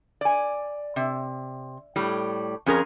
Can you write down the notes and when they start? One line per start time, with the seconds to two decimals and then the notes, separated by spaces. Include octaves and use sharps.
0.21 D5 G#5
0.96 C3
1.96 A2 G3
2.66 F2 C#4 G#4 A#4